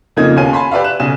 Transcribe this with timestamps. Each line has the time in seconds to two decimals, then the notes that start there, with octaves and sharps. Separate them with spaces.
0.16 F2 A#2 C#3 A#3 D#4 G#6
0.36 D#2 B2 C#4 F5 G#5 D#7
0.53 G#5 A5 B5 C6
0.71 G4 B4 D5 E5 F5
0.84 F#6 E7
1.00 B1 C#3 G#5 E7